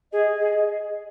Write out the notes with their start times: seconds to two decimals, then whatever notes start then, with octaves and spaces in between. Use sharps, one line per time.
0.12 G#4 D#5
0.40 G#4